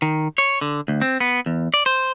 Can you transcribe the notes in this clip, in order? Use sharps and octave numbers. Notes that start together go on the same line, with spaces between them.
D#3
C#5
D3
D2
C4
B3
E2
D5
C5